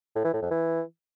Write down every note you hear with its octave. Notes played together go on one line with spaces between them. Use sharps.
A2
E3
A2
F2
E3